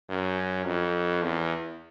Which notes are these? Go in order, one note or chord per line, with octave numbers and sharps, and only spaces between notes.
F#2
F2
E2